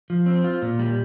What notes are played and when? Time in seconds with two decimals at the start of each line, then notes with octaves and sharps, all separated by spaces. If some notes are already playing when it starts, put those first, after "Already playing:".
0.10 F3
0.26 C4
0.44 F4
0.62 A#2
0.79 G3